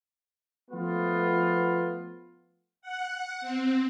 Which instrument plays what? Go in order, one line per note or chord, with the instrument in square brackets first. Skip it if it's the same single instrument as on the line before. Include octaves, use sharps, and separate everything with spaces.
[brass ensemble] F3 A3 B3 F4
[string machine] F#5
C4